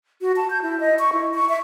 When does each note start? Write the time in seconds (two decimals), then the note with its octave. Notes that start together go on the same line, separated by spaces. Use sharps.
0.21 F#4
0.36 A5
0.50 G6
0.62 E4
0.80 D#5
0.99 C#6
1.13 E4
1.34 C#6
1.49 E5